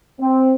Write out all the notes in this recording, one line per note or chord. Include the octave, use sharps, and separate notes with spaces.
C4